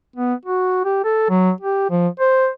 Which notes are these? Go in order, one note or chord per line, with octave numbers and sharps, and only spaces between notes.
B3
F#4
G4
A4
F#3
G4
F3
C5